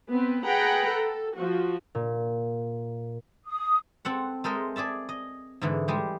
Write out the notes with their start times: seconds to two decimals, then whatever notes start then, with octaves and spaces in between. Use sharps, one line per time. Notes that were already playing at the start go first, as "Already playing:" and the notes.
0.11 B3 C4 B4
0.44 G#4 B4 F#5 G5 A#5 B5
0.89 A4
1.37 F3 F#4
1.95 A#2
3.45 D#6
4.05 C4 A4 F#5
4.44 G#3 A4 A#4 C5 D#5 E5
4.76 G#4 D5 E5 A5
5.09 D#5
5.61 G#2 D3 E3
5.88 G3 G#3 G4